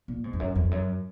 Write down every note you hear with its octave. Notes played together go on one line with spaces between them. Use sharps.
A#2
G#2
F2
F#2
F2
F#2